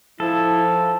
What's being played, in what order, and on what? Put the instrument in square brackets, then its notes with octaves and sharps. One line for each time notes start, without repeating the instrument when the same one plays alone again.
[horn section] F3 [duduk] E4 [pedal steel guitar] A4